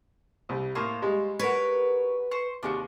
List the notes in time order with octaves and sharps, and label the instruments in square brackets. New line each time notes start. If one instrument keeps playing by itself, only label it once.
[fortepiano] C2 G3
[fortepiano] A2 A#3 [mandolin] F4 C5 C#5
[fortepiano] G3 G#3
[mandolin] F#4 A#4 C#5 [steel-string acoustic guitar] B4
[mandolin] C5 C#6
[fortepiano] D#2 C3 G#4 [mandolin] D4 F4 F#4